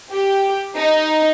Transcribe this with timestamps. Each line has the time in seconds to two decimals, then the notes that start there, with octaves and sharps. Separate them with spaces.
0.12 G4
0.78 D#4